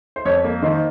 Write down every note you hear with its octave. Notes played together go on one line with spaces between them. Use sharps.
C5
F2 C#5
A#3
D#3 C5